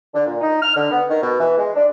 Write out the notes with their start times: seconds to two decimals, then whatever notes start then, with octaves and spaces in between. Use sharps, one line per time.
0.14 D3
0.26 A#2
0.41 D#4
0.62 F6
0.76 D3
0.91 B3
1.09 D#3
1.22 B2
1.39 E3
1.58 G#3
1.75 D4